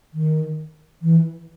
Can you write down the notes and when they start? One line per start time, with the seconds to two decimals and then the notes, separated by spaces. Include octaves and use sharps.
0.14 D#3
1.02 E3